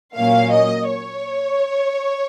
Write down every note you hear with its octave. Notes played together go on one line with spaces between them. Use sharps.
A#2 F#3 A#3 C#4 F5
D#5
C#5